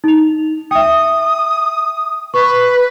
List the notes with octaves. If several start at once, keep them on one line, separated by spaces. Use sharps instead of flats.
D#4 F7
E5 G5 D#6
B4 C#6